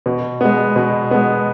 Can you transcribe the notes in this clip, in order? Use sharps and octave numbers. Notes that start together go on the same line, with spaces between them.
B2
G#3 B3
B2
G#3 B3